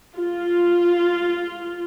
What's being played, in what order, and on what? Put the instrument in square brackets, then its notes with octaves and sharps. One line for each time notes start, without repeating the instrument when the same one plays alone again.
[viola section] F4